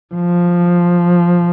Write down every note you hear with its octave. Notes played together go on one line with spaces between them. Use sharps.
F3